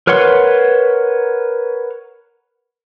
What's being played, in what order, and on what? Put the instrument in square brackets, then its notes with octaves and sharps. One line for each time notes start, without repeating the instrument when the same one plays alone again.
[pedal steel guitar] A#4 B4 C#5 F#5 C6